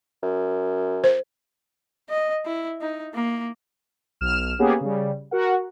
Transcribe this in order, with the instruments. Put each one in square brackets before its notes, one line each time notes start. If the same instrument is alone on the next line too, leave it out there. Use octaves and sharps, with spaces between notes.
[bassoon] F#2
[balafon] C5
[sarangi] D#5
E4
D#4
A#3
[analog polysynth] B1 F6 E7
A#3 B3 C#4 G4 G#4
C#3 G3
F#4 A#4 F#5